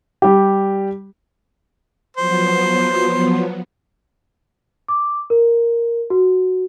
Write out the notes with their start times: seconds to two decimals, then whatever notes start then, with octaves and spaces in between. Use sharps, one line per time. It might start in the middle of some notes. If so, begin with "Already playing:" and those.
0.22 G3 G4
2.17 F3 F#3 B3 C5
4.88 D6
5.30 A#4
6.10 F#4